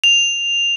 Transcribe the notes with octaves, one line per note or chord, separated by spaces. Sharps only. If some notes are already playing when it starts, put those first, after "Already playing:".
F7